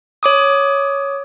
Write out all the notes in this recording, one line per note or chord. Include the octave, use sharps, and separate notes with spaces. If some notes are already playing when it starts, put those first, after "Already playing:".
C#5 D6 D#6